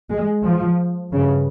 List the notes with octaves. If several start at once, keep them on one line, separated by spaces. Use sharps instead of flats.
G#3
F3
G2 C#3